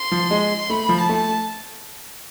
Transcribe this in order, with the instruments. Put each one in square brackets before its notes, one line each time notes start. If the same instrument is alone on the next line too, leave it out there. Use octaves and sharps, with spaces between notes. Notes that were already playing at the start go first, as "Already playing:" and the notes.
Already playing: [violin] C6
[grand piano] F3
G#3
[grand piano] A3 [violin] B5
[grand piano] F3
[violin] A5
[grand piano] A3